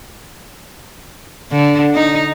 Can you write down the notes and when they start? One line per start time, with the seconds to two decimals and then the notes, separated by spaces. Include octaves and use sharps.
1.51 D3
1.94 D#4